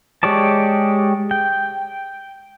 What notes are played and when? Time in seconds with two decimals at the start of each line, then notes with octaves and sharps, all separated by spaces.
0.23 G#3 G4 C#5 D5 A5
1.31 G5